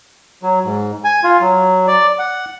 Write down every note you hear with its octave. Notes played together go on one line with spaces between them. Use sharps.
F#3
G#2
G#5
F4
F#3
D5
F#5